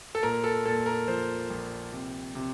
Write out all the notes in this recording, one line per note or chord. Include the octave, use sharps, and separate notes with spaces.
A4
A#2 A#4
A4
A#2 A4
A#4
F3 C5
A#1
C3
C3